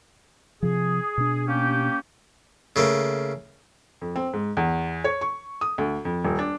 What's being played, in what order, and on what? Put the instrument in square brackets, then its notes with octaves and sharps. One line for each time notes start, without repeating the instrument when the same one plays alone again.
[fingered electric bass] C3 F3 [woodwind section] G#4
[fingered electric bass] B2 D4
[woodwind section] A#3 C#4 G4
[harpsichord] C#3 A3 A#3
[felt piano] F2
C4
G#2
E2
C#5
C#6
D#6
D2
F2
D#1
D4